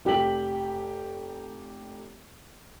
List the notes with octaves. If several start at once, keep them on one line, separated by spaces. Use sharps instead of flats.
F1 G4 G5 B6 F#7